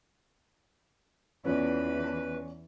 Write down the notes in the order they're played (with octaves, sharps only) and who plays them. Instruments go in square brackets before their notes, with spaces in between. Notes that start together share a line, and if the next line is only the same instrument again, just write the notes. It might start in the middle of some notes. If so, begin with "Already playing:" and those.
[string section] E2 [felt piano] C#4 F4 D5 [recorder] B4